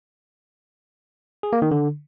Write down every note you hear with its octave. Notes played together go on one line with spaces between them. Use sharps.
G#4
A#3
D#3
D3